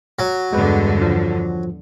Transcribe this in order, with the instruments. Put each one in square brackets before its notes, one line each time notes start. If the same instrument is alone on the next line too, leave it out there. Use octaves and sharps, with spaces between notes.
[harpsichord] F#3
[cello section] E2 G2 D3 [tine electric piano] G#3 B4
[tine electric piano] F3